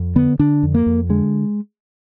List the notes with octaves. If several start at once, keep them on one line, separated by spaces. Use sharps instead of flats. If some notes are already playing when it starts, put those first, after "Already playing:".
Already playing: F2
D3 B3
D3 D4
F2
A#3
F2
D3 G#3